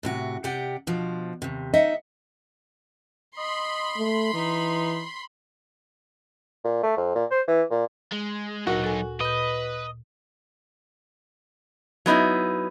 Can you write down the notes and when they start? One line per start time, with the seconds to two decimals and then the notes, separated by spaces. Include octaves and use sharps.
0.03 A2 C3 F#4
0.44 C3 G4 D5 F#5 G5
0.87 B2 F3 D4
1.42 D#2 C3
1.74 D#4 D#5 E5 F#5
3.38 D#5 B5 C6
3.98 A3
4.34 E3 D#4
6.64 A#2
6.83 A3
6.97 F2
7.15 A#2
7.31 C5
7.48 E3
7.71 A#2
8.12 G#3
8.67 D2 A#2 F#3 D#4 F#4 A#4
8.84 A4 G#5
9.21 A#2 B4 D#5 G6
12.06 F#3 B3 D#4 E4